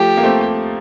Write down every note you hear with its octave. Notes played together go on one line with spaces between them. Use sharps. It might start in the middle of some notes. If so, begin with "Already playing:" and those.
Already playing: F3 A3 G4
A#3
A3 C4